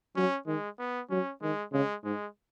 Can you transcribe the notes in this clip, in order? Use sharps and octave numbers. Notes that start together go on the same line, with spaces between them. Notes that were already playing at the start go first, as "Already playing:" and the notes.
F#3 C#4
D#3 G#3
B3
F#3 C#4
D#3 G#3
C#3 G#3
G#2 G#3